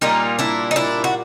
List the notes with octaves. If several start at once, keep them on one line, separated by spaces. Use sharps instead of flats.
A#2 G3 A#3 D#4 F4
D4 E4
D#4
D4 E4
F#4